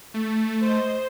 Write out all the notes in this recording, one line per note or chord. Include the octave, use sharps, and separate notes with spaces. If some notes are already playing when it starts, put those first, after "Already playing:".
A3
C5 D#5